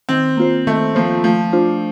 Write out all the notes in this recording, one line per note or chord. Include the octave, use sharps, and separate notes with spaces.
D#3 C4
A#3 F4 C5
D#3 A3
F3 A#3 F4 C5
F3 A3
D4 F4 C5